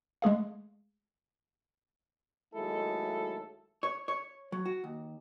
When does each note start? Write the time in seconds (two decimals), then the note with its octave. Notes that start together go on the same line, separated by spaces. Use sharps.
0.22 G#3 A3 G#4 F5
2.55 D#2 F#3 G#3 A3 E4 A4
3.83 C#5
4.08 C#5
4.52 F#3
4.65 F#4
4.84 D#2